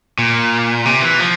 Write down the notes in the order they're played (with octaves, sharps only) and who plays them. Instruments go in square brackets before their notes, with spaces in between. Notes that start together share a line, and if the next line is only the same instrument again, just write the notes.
[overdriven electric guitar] A#2
C3
E3
F3